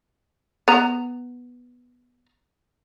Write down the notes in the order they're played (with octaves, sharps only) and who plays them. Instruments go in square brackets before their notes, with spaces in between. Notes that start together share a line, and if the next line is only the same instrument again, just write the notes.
[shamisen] B3 A#5